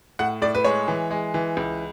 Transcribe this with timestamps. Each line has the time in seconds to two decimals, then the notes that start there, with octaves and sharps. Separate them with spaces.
0.19 A2 F#5
0.42 A2 D5
0.55 B4
0.64 G#3 C#5
0.88 E3
1.11 G#3
1.34 E3
1.57 C#2